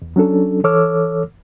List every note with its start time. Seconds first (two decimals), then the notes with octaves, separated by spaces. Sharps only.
0.02 E2
0.16 F#3 C#4 D4 A4
0.64 E3 A4 C#5 D6 E6 F6